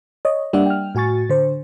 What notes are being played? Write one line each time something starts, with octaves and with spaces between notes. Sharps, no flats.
C#5 D#5
G3 A#3 D4 D5 E5 F#5
G5 F6
A2 F#4 G#5 C#6 A6
D3 C5